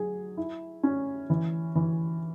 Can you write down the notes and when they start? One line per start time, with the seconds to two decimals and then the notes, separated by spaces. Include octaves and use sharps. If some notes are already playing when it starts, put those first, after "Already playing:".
Already playing: F#3 G#4
0.37 E4
0.83 C#4
1.30 E3
1.76 E3